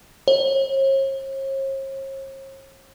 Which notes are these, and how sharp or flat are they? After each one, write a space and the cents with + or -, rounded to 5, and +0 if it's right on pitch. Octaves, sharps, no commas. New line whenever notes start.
C#5 -45